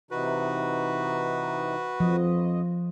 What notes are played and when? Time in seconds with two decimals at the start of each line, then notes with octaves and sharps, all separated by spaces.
0.11 C3 E3 D#4 F#4 B4
2.00 F2 F3 D#5